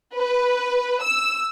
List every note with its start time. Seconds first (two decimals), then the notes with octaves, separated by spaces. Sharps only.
0.17 B4
1.02 E6